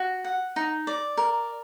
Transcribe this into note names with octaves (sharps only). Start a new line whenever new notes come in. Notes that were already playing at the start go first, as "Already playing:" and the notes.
Already playing: F#4
F#5
D#4
D5
A#4